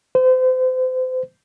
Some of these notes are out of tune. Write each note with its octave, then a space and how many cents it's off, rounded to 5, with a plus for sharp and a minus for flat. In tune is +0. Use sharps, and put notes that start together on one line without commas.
C5 -35